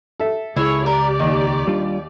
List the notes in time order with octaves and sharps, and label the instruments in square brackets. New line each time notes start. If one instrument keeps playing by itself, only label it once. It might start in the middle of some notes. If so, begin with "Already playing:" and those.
[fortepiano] A4 E5
[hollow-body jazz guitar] C#2 [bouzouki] E4 [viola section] G#4 C#5
[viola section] G4 D5 [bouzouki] A#4
[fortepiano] D#2 D#5 [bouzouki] D#3
[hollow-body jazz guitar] G3 D4 F4